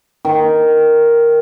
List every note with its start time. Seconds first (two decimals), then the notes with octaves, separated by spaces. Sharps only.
0.25 D#3